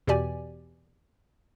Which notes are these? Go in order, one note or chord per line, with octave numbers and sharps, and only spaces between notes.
E2 B2 E3 G4 D5 G#5